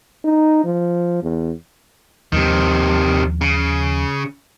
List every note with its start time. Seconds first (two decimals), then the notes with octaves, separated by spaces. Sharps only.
0.25 D#4
0.64 F3
1.23 E2
2.32 D#2 C3 D#3 F3 G#3
3.41 C#3